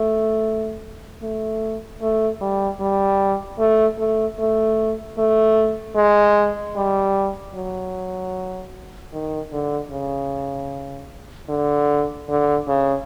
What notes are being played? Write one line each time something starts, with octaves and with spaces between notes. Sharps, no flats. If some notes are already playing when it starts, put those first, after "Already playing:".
Already playing: A3
A3
A3
G3
G3
A3
A3
A3
A3
G#3
G3
F#3
D#3
D3
C#3
D3
D3
C#3